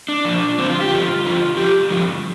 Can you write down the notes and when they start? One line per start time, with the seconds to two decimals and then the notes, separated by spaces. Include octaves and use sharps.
0.08 D4
0.25 A#2 F3
0.58 F2 D3 F3 C4
0.70 F4
0.81 G4
0.91 G2 D3 F3 F4
1.24 F2 D3 F3
1.57 F2 F3 G4
1.90 G2 D3 F3